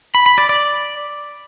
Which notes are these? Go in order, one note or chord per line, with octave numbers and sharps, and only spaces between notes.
B5
B5
D5
D5